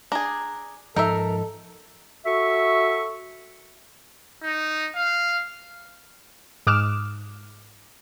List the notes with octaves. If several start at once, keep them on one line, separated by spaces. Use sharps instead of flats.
D4 G#4 G#5 A#5
G#2 F3 D#4 A4 A#4 E5
F#4 A4 E5 C#6
D#4
F5
G#2 D6 D#6 F6 F#6 E7